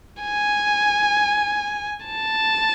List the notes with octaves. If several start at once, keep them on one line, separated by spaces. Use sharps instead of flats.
G#5
A5